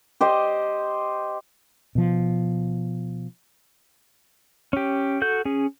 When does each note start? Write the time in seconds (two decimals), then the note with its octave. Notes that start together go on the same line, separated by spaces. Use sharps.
0.21 G4 C5 D#5
1.95 B2 F3
4.73 C#4 G4
5.22 F#4 A4 G6
5.45 C#4 G#4